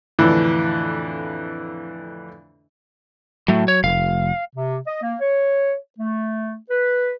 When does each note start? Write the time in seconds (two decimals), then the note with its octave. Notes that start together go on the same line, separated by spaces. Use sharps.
0.19 F2 A2 D3 E3 D4
3.48 A2 F#3 A3
3.68 C#5
3.84 F1 F5
4.55 C3
4.87 D#5
5.02 A#3
5.21 C#5
5.98 A3
6.70 B4